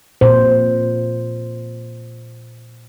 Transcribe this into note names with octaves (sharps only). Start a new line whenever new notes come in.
A#2 C5